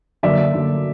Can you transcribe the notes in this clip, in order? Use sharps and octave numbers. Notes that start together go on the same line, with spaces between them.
F#2 D3 F#3 A#3 D5 E5
F#2 D3 F#3 A#3